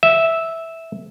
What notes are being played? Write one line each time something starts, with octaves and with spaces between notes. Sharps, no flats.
E5